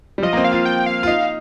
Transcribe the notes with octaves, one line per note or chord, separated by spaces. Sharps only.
G3
F3 D#5
A#3
C4
F5
F4
G5
F5
F4
D#4 F5